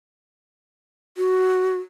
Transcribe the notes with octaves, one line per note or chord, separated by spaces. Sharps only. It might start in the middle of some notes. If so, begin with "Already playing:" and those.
F#4